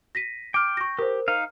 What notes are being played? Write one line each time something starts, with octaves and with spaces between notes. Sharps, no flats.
A#6 B6 D#7
G5 D6 F6
C#6 A#6
G4 A#4 C5
D#4 F5